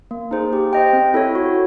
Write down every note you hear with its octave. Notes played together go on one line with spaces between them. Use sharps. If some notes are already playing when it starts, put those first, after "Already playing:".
A#3
D#4 G#4 C5
G4
C5 D#5 G5
C4
E4 A4 C#5
F#4